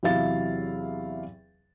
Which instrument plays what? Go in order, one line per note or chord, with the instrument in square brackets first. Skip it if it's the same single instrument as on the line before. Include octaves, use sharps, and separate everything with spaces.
[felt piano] E2 C3 F#3 E4 F5 A6